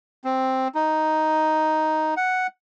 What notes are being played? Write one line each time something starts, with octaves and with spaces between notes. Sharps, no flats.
C4
D#4
F#5